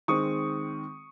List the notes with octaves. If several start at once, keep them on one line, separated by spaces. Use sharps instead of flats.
D#3 G#3 C4 C#6 D#6